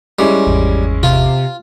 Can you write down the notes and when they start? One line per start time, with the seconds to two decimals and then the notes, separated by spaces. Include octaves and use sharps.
0.19 G3 G#3 C#4 E4
0.47 G#1 E2
1.03 C3 F4